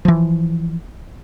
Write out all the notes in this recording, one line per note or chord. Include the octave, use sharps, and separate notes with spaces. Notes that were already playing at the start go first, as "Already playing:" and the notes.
E3 F3